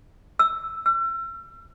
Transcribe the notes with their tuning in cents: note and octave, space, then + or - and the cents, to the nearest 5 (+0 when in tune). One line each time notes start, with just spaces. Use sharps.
E6 +0
E6 +40